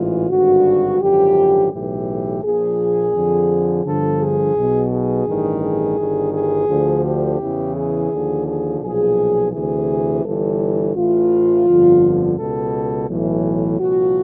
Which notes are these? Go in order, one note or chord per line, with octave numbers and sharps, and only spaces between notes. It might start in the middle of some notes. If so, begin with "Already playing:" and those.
Already playing: A1 G#2 E3 F4
G#1 G2 D3 F#4
G#1 F#2 D3 F3 G4
B1 A2 E3 G4
A#1 A#2 F3 G#4
F2 D3 F3
G1 G2 D3 F3 A4
G#4
B1 B2
G#4
A1 G2 D#3
G#4
G1 G2 D#3
G#4
D2 D3 F3
G4
E2 C#3 E3
G#4
D#2 D3 F3
G#4
B1 A#2 F3 G#4
D2 C3 E3 G#4
G1 G2 E3 A4
A1 A2 E3 F4
G1 F2 D3 F3
C#2 B2 A4
B1 A2 E3
C2 A#2 F3 F#4